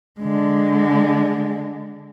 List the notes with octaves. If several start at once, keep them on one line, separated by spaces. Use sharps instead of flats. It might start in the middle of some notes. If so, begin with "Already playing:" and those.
D3 G#3